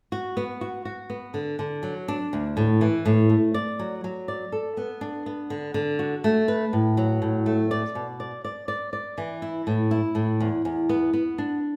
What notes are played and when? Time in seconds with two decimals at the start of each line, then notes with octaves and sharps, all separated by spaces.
0.12 F#4
0.37 B3
0.61 F#4
0.85 F#4
1.10 B3
1.34 D3
1.59 D3
1.83 F#3
2.08 D4
2.33 D2
2.57 A2
2.81 E3
3.05 A2
3.30 A3
3.54 D5
3.79 F#3
4.04 F#3
4.28 D5
4.52 A4
4.77 B3
5.01 D4
5.26 B3
5.50 D3
5.74 D3
5.99 F#4
6.24 A3
6.48 B4
6.73 A2
6.97 F#3
7.22 A2
7.46 A3
7.71 D5
7.95 B2
8.20 D5
8.45 D5
8.68 D5
8.93 D5
9.18 E3
9.42 E4
9.67 A2
9.91 E4
10.15 A2
10.40 E2
10.65 E2
10.89 B3
11.13 B3
11.38 D4